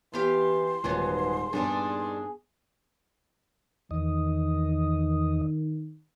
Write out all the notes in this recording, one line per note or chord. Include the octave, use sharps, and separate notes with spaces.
E3 B3 G4 F5 C6
D#1 G#2 E3 F#3 B3
G2 A#2 B3 D4 D#4 G#4
E2 D#3 D#5